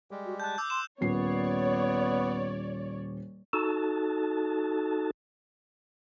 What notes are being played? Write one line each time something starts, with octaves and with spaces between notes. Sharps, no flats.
G3 G#3 G4
F#4
A5 F#6 G6
D6 E6 G6
C6 D6 E7
D#1 B3 C#4 C#5 D5 C7
D#4 F#4 A4 A5